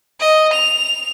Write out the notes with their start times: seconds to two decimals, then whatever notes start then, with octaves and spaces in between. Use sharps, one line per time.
0.20 D#5
0.53 F7